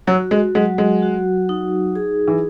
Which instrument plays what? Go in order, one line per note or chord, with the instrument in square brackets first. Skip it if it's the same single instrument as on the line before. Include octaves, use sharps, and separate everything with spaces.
[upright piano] F#3 [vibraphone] F#4
[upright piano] G#3
[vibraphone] F#3 [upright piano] G#3
[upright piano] G#3
[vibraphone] F#4
D#4
G#4
[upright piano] E3